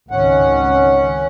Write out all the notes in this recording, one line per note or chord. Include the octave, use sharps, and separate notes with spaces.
G#1 C#2 D#3 C#4 F#5